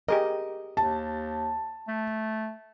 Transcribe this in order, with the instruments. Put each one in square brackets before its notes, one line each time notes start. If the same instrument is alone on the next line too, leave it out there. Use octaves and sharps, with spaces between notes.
[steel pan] G4 G#4 A#4 [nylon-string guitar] D#5
[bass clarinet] D#2 [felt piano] A5
[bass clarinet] A3